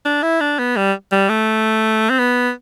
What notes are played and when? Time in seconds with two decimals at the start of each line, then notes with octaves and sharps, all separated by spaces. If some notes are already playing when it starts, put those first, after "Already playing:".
0.05 D4
0.22 E4
0.40 D4
0.59 B3
0.76 G3
1.12 G3
1.29 A3
2.10 C4
2.19 B3